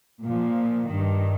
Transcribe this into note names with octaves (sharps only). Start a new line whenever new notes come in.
A#2 F3
G2 D#3